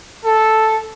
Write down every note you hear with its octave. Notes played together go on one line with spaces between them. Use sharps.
A4